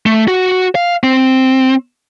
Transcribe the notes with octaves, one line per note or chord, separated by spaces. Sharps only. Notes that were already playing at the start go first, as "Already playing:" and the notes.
A3
F#4
F5
C4